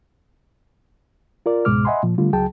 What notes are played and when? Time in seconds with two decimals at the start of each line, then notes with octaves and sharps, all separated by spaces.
1.46 F4 A#4 D5
1.65 C#2 G#2 B2 G#3 D6 F6
1.85 D#5 E5 F#5 G#5 B5 C6
2.03 A#2 F3
2.18 D3 G3 A3 F4
2.33 C#2 F#3 G#4 G5 A5